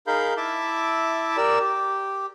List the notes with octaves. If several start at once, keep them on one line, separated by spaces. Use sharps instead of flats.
D#4 G#4 A#4 F5 B5 G6
E4 E5 A5 D6
G4 A#4 D5 E6
G4